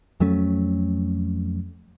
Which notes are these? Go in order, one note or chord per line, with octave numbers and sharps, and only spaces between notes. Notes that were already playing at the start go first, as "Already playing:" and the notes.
F2 F#3 A3 C#4